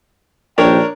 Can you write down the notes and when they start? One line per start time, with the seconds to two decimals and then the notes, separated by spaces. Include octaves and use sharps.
0.58 A#1 D#2 D4 A#4 C#5 G5